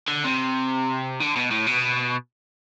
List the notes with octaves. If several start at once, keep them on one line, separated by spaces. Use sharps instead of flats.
D3
C3
D3
B2
A2
B2